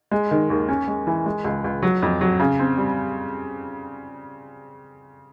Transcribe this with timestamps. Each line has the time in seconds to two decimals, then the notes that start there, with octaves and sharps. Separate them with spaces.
0.11 G#3
0.31 D#3
0.50 D#2
0.69 C#4
0.87 G#3
1.07 E3
1.26 G#3
1.45 C#2
1.64 C#2
1.82 F#3
2.02 F2
2.21 F#3
2.39 C#3
2.59 C4
2.78 G3